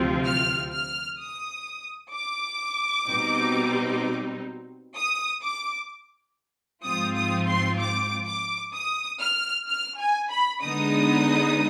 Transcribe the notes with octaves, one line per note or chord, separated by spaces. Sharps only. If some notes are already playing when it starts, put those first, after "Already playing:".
Already playing: D2 C3 F3 C4 F4
F6
F6
D#6
D6
B2 G3 C4 D#4
D#6
D6
G#2 F3 C4 F4 D#6
D#6
C6
D6
D6
D#6
F6
F6
G#5
B5
D3 G#3 B3 D#4 D#6